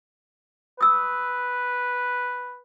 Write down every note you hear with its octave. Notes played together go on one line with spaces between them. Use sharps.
B4 D#6 E6